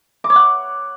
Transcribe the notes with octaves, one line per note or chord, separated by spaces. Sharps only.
D6
C#5
F#5